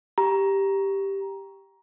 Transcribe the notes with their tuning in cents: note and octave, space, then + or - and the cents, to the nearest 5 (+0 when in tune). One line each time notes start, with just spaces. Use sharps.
G4 +0 A#5 +15